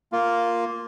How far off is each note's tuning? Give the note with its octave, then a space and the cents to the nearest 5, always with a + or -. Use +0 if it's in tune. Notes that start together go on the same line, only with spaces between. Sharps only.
A#3 +0 F4 +0